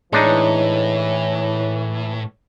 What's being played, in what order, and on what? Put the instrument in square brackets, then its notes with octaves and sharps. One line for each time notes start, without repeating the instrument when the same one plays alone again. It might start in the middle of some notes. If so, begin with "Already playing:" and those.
[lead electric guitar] A2 [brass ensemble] E3 [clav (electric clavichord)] G#3 D4 D#4 [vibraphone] C#5